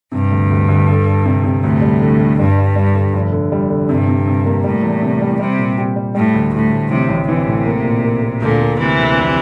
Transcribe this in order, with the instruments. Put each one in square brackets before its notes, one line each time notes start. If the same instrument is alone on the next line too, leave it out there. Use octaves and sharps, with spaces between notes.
[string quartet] G2 [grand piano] C3
[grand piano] D2
D2
D2
A4
A4
C3
C3
[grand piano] D2 [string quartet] A2
[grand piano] G3
D3
G3
[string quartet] G2 [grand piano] G3
[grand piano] D4
G3
D3
F1
D3
G3
D3
[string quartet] G2 [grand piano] C3
[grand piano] C3
C3
A#3
[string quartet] A2 [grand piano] G3
[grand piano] E2
C3
G3
[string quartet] C3 [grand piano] G3
[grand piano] A#2
G4
G3
[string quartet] A2 [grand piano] G3
[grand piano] D2
[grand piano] D2 [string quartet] A2
[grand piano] D2
[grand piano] A1 [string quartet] C3
[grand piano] A1
[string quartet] C3 [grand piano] E3
[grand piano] A2
A#3
A#2
A#3
A#3
[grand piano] D2 [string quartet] A#2 D3
[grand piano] A#3
[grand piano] D2 [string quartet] C3 E3
[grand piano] D2
F1